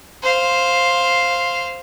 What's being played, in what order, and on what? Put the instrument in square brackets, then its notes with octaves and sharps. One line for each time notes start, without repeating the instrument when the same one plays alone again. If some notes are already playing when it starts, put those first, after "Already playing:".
[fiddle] C5 F5